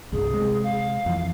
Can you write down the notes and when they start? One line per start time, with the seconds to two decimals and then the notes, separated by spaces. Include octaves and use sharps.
0.12 C2 G2 G#4
0.30 C3 G#3
0.63 F5
1.06 F2 E3